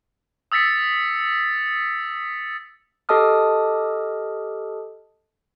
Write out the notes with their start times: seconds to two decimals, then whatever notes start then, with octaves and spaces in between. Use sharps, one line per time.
0.52 D#6 E6 A6 B6 C#7
3.09 G4 A4 D#5 A5 D#6 F6